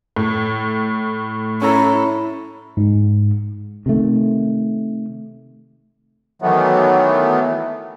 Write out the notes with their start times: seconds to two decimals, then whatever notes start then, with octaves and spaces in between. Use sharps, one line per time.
0.16 A2
1.62 C#4 E4 A4 A#5
2.77 G#2
3.86 C3 D#3 A3
6.42 D#3 E3 F#3 A3 B3